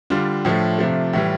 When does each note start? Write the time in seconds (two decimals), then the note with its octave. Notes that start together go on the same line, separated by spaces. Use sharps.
0.10 D3 G3 D4 F4
0.45 A2 F3 A3
0.79 C3 F3 A3
1.13 A2 E3 G3